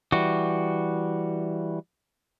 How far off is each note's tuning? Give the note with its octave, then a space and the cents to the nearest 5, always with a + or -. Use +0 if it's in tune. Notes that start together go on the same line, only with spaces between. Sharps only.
E3 +0 G3 +0 F#4 +0